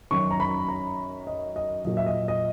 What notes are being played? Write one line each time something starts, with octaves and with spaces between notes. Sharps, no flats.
F#2 D#3 F#3 C#6
A#5
B5
A#5
D#5
D#5
A#2 F#3 D#5
E5
D#5
D#5